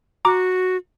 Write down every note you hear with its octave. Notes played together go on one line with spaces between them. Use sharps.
F#4 A#5 D6